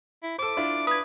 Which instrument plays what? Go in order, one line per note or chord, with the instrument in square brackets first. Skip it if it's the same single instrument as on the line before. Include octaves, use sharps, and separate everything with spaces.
[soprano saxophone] E4
[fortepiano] A4 C5 [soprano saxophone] D6
[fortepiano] D4 E4 F4
[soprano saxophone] B4 [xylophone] D#6 G#6